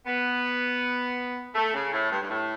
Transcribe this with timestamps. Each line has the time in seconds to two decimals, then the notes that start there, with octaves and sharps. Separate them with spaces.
0.06 B3
1.55 A3
1.74 C#3
1.92 A2
2.11 G2
2.22 G2
2.30 A2